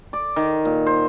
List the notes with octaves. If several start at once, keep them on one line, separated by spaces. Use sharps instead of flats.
D5
D#3
A#2
C5